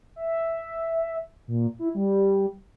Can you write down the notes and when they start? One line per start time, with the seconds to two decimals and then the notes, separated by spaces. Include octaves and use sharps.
0.16 E5
1.48 A#2
1.79 E4
1.95 G3